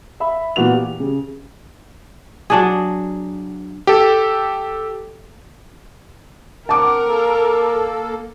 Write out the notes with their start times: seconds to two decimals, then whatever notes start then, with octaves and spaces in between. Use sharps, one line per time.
0.20 E5 B5
0.56 A#2 E3 B3 F#4 B4 F7
0.74 G4
1.00 C#3
2.50 F#3 D4 G#4
3.87 G4 A4
6.69 C4 A#4 F#5 A5 D6
7.06 A#3 A4